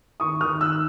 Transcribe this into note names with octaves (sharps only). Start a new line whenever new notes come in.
D#3 C#6 D#6
D#3 D#6 F6
D#3 E6 F#6